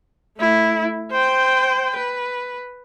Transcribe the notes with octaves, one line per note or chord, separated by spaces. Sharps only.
A3 E4
C5 G5
B4